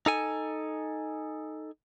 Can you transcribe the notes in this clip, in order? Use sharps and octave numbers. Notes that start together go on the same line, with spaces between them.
D#4 A4 G#5